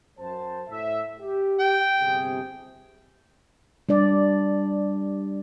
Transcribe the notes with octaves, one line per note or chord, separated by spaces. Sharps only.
F#2 C5 A5
A2 E5
G4
G5
G1 C3 G#4
G3 D4 D5